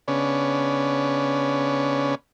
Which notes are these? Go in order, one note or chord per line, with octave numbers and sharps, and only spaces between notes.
C#3 B3 C#4 D4